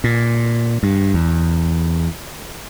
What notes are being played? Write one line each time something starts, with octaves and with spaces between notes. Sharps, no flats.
A#2
G2
E2